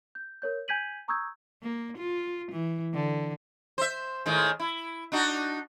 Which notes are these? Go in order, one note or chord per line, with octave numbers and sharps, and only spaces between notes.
G6
A#4 C#5 G6
G#5 G6 G#6 B6 D#7 F#7
A#5 C#6 D#6 E6 G6 G#6
A#3
F4
E3
D3
C5 E5
A2 D#3 G#3
E4
D4 D#4 F#4